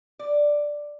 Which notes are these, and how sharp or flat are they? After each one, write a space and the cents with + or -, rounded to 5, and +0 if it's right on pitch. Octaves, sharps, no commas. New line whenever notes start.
D5 +5